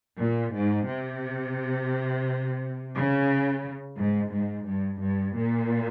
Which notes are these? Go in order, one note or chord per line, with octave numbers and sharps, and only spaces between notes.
A#2
G#2
C3
C#3
G#2
G#2
G2
G2
A#2